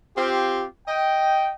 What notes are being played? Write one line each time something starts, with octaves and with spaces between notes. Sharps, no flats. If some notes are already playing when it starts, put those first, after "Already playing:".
C4 F4 G4
D#5 G5